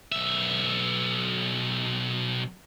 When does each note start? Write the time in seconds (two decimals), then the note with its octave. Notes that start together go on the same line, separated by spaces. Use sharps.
0.12 B1 E5